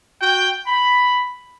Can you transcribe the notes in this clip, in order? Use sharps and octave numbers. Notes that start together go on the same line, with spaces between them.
F#4 G5
B5